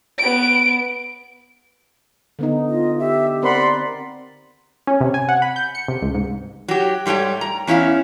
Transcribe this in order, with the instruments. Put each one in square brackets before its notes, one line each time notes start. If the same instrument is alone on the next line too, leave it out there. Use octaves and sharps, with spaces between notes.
[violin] B3 D7
[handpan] D3 B3 D#4
[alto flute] F4 [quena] D#5
[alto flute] G4 [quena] E5
[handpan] C4 A#4 [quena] D5 [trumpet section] F#5 B5 C6
[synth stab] C#4
C3
G#5
F#5
B5
G6
C#7
C3
C#2
G#2
[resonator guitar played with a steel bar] F#3 G4
G#2 G3 A3 C#5 G5
A#5
E2 C#4 E4 F4 F5